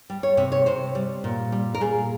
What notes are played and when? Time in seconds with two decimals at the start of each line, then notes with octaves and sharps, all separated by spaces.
0.10 G3
0.23 C#5
0.37 C3 E5
0.52 C#5
0.66 C3 C5
0.95 G3
1.24 A#2
1.52 G3
1.74 A#4
1.81 A#2 G#4